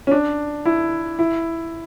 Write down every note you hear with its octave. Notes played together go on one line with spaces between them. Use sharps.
C#4
D4
E4
E4